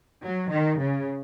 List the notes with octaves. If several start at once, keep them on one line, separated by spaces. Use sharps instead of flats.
F#3
D#3
C#3